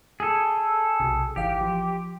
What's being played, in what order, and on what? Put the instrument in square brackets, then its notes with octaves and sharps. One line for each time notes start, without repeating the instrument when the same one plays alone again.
[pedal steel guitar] G#4 A4
[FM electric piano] B1 C3
[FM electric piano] G#1 E3 F5 [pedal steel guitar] G4
[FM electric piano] F3